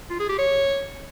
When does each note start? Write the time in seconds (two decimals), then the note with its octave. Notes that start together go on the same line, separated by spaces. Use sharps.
0.10 F4
0.20 G#4
0.29 G4
0.39 C#5